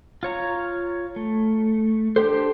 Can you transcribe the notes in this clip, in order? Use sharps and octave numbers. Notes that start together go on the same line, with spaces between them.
F4 C#5 A#5
A3
D4 G4 A4 C5